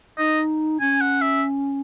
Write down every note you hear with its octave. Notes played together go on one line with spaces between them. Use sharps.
D#4 D#5
C#4 G#5
F#5
E5